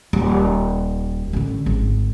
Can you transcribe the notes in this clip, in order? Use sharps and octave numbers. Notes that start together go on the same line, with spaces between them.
D#1
A1 D3
G#1